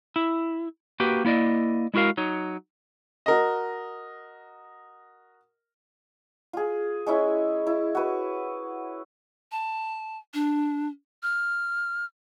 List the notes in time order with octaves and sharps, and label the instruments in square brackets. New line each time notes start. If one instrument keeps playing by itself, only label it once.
[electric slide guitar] E4
A#3 F#4 G4 B4
A#3 E4 D5 D#5
G#3 E4 F#4 A#4 F5
F#3 D#4 C#5
[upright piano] F#4 A#4 D#5
[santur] F4 G#4
G#3 C#4 E4 E5
E4
F#4 B4
[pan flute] A5
D4
F6